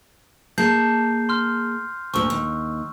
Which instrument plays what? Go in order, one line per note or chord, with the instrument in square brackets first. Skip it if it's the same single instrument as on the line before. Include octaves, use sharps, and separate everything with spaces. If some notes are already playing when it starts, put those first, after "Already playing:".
[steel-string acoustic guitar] A#3 G#4 A5 [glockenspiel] G6 C7
[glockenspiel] C6 F6
[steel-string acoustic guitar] D2 A#2 [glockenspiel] C#6 E6
[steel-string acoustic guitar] D#2